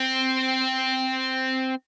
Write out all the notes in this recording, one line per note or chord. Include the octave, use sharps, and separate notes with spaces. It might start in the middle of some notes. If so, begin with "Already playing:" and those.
Already playing: C4